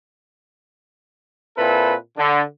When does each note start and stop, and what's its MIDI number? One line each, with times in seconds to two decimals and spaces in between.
1.57 1.93 46
1.57 1.93 60
1.57 1.93 64
1.57 1.93 69
1.57 1.93 71
2.17 2.42 50